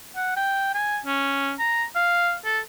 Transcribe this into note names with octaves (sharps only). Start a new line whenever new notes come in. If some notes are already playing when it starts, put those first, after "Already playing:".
F#5
G5
G#5
C#4
A#5
F5
A4